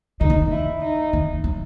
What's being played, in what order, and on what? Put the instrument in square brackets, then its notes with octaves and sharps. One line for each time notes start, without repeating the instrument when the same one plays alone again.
[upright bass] D3 [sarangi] D#4
[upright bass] D#3
[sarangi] E4
D#4
[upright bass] D#3
F#3